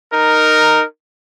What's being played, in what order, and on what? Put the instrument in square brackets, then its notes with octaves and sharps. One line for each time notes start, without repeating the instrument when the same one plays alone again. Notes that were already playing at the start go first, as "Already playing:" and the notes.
[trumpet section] D#4 A#4